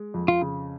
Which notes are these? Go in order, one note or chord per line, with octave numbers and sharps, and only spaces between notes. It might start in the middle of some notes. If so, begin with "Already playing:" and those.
Already playing: G#3
F2
F4
C#3